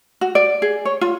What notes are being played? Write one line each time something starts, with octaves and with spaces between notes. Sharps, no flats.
F#4
D5
G#4
C#5
F4